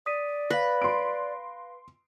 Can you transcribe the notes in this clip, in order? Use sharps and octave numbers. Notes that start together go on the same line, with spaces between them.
D5 D#6 B6 D#7
B4 F5 A#6
C6 D7